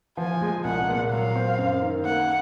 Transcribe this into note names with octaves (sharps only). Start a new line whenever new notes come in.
F3 G#5
G#3
C2 F#5
A#2
F#3 F5
C4
F#2
D#3
A#3 F#5